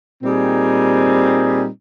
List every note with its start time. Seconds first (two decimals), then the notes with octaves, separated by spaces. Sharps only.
0.23 A#2 G3 C4 D#4 G#4